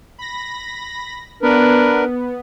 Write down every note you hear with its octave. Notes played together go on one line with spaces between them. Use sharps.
B5 A#6
B3 D4 A#4 B4